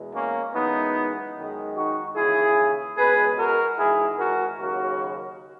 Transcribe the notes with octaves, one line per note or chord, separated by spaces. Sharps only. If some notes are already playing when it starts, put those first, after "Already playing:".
Already playing: E2 B2 G#3
A#3 C#4
F#2 E3 G#3 B3 D#4
F#2 D#3 G#3
D#4 F#4
D#2 C#3 E3 E4 G#4
C#2 B2 G#3 G#4 B4
F#4 A#4
G#1 G#2 E3 E4 G#4
F#4 A#4
D#2 C#3 F#3 A#3 F#4 A#4